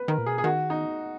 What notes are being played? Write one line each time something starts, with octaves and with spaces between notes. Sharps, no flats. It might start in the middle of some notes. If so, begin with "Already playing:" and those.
Already playing: B4
D#3 A#4
A#2
B2 G#4
G#4
D#3 F#4
D#4